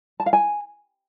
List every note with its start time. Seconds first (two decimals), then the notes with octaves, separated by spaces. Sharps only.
0.20 A5
0.26 F5
0.33 G#5